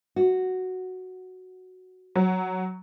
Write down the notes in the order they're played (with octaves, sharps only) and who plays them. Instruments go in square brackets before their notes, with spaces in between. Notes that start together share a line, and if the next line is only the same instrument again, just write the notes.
[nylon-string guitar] F#4
[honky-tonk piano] F#3